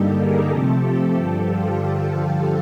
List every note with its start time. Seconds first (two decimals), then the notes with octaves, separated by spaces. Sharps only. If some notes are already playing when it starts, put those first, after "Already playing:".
Already playing: G2 D3 G3 A#3 D#4 G4 A4
0.18 G#4 A#4
0.50 C3 F3 A3 C4 G4 A4
0.83 G4 A4
1.14 G2 D3 F3 G4 A4
1.47 F4 G4